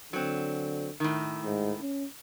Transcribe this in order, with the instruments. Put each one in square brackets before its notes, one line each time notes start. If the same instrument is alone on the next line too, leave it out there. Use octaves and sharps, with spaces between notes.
[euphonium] D3 [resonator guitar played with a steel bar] F#3 C4
[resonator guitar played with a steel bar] A2 D#3
[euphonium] G#2
C#4